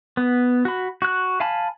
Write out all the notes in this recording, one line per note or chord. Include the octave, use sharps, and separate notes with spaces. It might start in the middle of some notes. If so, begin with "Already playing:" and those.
B3
F#4 B5
F#4 F#6
F5 G#5 A5 B5